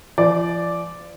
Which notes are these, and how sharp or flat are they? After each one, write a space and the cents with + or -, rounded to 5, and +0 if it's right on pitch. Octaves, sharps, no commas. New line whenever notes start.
F3 -40 D5 +0